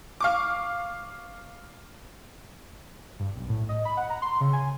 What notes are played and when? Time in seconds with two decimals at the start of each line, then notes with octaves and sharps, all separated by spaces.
0.21 F5 C#6 D6
3.19 G2
3.35 B1
3.49 A2
3.69 D#5
3.85 B5
3.97 F#5
4.10 A#5
4.22 C6
4.41 C#3
4.53 G#5